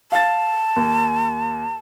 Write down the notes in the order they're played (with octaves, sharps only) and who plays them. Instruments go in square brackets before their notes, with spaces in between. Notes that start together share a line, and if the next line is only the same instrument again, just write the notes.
[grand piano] F5 A6 [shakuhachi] A5
[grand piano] D#2